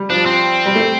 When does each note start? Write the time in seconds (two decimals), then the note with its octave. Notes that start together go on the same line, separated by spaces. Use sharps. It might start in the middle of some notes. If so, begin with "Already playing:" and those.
Already playing: G3
0.10 F3 D4
0.26 C4
0.66 G3
0.75 A3